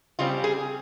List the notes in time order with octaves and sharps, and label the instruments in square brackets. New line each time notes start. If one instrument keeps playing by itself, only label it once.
[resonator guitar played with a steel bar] C#3 G3 C4 F4
G#4